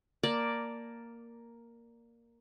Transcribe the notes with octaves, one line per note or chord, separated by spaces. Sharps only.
A#3 D5 A5